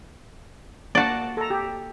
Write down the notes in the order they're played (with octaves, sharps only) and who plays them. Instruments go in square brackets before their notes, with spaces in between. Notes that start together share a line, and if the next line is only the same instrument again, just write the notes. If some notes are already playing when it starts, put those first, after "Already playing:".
[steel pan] A#3 F#5 A5 [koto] F#4 D5
[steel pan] A4 A#5
G4